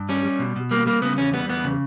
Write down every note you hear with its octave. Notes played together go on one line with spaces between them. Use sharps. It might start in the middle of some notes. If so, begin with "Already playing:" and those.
Already playing: G2
G3 C#4
G3
B2
B2
G3 A#3
G3 A#3
C#3 B3
E2 C#4
G3 B3
E2 B3
C#3